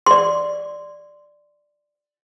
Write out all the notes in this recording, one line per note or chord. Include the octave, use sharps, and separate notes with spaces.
D5 C6